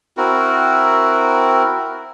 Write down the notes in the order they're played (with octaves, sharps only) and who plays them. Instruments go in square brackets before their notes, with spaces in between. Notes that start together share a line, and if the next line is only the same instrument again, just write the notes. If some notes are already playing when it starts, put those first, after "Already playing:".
[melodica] C4 E4 F#4 A#4